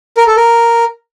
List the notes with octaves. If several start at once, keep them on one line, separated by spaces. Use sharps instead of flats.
A#4
A4
A#4